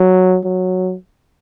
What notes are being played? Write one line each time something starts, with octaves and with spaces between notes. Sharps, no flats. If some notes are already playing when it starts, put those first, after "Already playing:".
Already playing: F#3
F#3